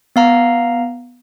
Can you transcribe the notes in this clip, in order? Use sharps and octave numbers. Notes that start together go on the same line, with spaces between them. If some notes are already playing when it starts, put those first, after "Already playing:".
B3 F5 A#5